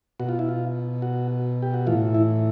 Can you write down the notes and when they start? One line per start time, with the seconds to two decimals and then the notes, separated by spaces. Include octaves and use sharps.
0.20 B2 F#4
0.29 F4
0.39 E4
0.49 F4
1.02 F#4
1.62 G4
1.74 F#4
1.87 A2 E3 F4
2.14 E4